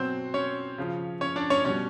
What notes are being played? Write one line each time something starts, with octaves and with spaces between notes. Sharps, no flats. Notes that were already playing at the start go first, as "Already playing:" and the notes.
Already playing: B2 F#3 C4 C5
C#4 C#5
C#3 F3
C#4 C#5
D4 D5
C#4 C#5
B2 G3 C#4 C#5